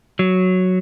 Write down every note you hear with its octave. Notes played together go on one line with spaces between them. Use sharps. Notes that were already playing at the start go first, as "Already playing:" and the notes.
F#3